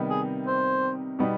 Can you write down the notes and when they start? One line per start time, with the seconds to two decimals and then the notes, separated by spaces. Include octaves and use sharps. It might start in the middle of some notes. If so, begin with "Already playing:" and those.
Already playing: C3 D#3 G3 B3 D#4
0.10 G#4
0.47 C5
1.19 B2 G3 B3 D#4